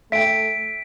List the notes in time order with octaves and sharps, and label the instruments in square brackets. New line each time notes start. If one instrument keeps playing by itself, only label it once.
[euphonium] A3 [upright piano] E5 G5 [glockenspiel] B6 D7